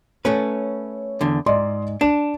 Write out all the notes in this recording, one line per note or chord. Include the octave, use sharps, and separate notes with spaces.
A3 C#4 B4 C#5
E2 D3
G#2 D5 D#5 C6
D4 E7